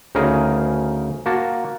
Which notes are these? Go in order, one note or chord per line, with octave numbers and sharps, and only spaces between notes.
D2 C#3 D#4 G#4 A#4
A#3 F#4 A5